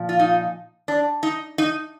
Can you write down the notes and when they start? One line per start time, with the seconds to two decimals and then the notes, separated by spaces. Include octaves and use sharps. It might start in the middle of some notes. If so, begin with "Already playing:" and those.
Already playing: A#2 F3
0.09 F4
0.19 D#4
0.88 D4
1.23 D#4
1.58 D#4